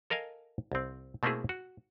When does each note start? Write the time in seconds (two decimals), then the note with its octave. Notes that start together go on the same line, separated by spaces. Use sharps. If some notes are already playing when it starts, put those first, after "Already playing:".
0.10 A4 A#4 D#5 F5 G#5
0.72 C2 C4
1.23 B2 A3 A#3 C4 E4 G#4
1.49 F#4